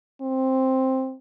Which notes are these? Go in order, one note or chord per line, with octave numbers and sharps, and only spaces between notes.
C4